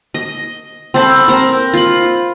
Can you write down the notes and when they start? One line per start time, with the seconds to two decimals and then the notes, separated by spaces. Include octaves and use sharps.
0.14 D#5
0.94 C4 A4 B5
1.28 C4 A#4
1.74 F4 B5